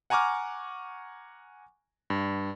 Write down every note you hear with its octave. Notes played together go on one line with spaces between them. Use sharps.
F#5 G#5 A#5 C#6 D6 F6
G2